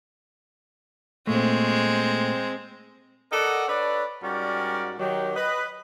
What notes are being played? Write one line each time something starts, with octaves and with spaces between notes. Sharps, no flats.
A#2 G#3 A3 C4
A4 A#4 D5 D#5 F#5
D4 A4 B4 C#5 D5
G#2 G3 C#4 F#4 A#4 D5
D#3 F#3 G4
B4 D#5